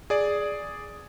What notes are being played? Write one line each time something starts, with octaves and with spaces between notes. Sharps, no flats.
G#4 D5